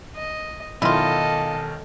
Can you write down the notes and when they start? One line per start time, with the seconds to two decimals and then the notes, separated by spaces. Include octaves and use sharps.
0.15 D#5
0.82 B1 D#3 E4 F4 A4 D#5